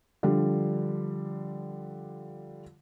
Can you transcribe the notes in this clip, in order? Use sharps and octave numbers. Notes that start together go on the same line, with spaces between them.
D3 F3 G3